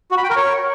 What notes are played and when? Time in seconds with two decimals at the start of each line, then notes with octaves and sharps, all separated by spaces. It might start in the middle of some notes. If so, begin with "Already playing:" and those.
0.11 F#4
0.17 B5
0.24 G5
0.30 A#4
0.36 C#5